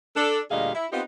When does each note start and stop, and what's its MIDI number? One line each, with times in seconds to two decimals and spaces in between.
0.16 0.40 62
0.16 0.40 69
0.51 0.70 38
0.51 0.70 46
0.51 0.70 55
0.51 0.70 68
0.51 0.70 75
0.51 0.70 77
0.74 0.87 64
0.92 1.02 59
0.92 1.02 60
0.92 1.02 63
0.92 1.02 65
0.92 1.02 67
0.92 1.02 71